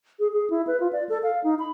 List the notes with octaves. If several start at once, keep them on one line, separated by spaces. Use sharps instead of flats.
G#4
G#4
E4
B4
F4
D5
A4
F5
D#4
B5